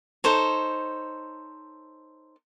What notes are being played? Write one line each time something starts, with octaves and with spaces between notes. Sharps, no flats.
D#4 A4 C5 C#5